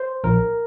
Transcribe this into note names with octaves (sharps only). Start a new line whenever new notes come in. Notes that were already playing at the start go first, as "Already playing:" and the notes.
Already playing: C5
A#1 A#4